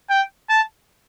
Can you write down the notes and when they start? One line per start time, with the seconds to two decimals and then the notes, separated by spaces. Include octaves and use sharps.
0.10 G5
0.49 A5